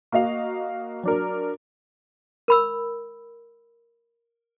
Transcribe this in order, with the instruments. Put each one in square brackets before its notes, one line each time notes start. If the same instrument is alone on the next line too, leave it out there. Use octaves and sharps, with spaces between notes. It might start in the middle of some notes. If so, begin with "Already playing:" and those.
[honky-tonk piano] A#3 F#4 D#5 F5
F#3 D4 A#4
[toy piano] A#4 B5 E6